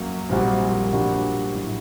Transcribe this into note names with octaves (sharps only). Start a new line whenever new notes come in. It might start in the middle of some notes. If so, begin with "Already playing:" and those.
Already playing: F#2 F#3 A#3
A#1 A#2 G3 C4 F#4
A#2 G3 D4 F#4
A2 F#3